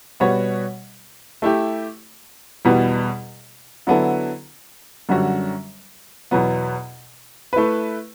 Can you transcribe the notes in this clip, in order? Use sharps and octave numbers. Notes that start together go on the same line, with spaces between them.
B2 G3 B3 F#4 C#5
A3 E4 G4
E2 B2 G3 B3
D3 F#3 B3 E4 A4
F#2 D3 G3 C#4 F#4
E2 B2 F#3 B3
A3 E4 B4